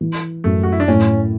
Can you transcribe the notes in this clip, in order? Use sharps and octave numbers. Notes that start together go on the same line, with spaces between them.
E3
F#2 A3
F#4
E4
D4
A2 C#4